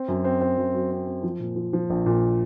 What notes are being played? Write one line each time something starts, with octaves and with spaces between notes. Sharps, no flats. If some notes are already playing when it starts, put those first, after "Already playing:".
Already playing: C4
F#2
C4
C4
F#2
F#3
C4
C4
F3
A#2
F3
F3
A#1
A#2